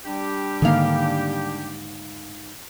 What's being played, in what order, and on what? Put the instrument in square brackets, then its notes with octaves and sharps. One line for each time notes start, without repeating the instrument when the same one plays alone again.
[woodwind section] G3 D4 G4
[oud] G#2 F5 [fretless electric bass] D3 D#3 A#3